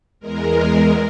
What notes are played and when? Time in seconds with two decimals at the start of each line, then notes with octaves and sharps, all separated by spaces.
0.20 E2 G#3 A#4